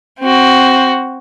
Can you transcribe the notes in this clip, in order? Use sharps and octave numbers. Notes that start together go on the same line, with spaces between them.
C4 F#4